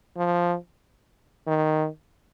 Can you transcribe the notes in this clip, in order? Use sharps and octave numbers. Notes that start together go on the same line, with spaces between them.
F3
D#3